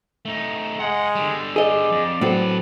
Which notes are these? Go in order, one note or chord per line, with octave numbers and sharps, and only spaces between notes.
A3 D#4
G#3 F#5 G5
D3 G3
G#4 D5 D#5
F2
A2 F#3 C4 A4 B4